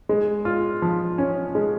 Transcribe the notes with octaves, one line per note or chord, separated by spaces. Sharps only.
G#3
F4
F3
C#4
G#3